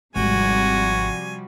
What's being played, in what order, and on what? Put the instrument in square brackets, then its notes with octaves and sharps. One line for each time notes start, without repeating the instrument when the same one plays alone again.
[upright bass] G#1 [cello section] C3 F3 G3 [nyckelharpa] F#4 [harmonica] G#5